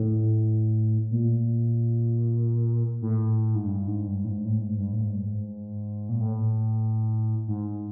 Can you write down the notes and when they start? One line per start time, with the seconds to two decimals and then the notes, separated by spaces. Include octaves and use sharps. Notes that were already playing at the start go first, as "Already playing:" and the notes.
Already playing: A2
1.11 A#2
3.02 A2
3.55 G#2
3.65 G2
3.87 G#2
4.07 G2
4.24 A2
4.29 G#2
4.45 A2
4.61 G#2
4.77 G2
4.92 A2
5.04 G#2
5.15 G2
5.26 G#2
6.09 A#2
6.20 A2
7.48 G#2